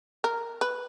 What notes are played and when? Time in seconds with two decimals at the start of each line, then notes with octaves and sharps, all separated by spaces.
0.24 A#4
0.61 B4